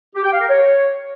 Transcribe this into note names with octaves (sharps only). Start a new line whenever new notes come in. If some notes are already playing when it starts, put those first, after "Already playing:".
G4
G5
F5
A#4
C#5